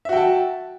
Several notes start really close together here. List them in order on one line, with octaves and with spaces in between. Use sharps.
E5 F#4 G5 A5